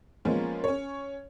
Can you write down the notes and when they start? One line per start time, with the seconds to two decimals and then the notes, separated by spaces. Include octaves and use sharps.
0.25 F3 G#3 A#3 B3 C#4
0.64 C#4 C#5